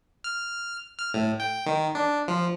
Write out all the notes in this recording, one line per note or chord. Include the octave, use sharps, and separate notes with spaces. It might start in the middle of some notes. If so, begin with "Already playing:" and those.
F6
F6
A2
G5
D#3
D4
F3